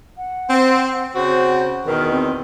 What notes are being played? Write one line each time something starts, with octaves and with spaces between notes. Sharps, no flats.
F#5
C4
C#3 C4 F#4 C5
E2 B2 D#3 A#4
C4